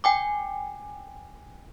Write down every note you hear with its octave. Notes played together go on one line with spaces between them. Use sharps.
G5 G#5 D6